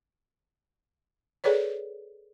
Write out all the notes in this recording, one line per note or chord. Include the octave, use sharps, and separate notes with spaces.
G#4 A4 B4 C#5 D5